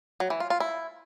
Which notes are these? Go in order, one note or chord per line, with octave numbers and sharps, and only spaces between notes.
F#3
E3
F4
F4
E4